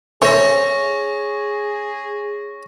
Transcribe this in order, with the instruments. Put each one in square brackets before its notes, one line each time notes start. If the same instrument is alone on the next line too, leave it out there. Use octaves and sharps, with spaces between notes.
[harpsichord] C#4 C#5 [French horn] G#4 [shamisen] A4 C5 E5 [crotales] C#6 A#6